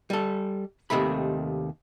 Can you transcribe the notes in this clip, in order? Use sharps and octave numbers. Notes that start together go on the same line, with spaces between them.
G3 A4
D#2 C3 D#3 A3 B5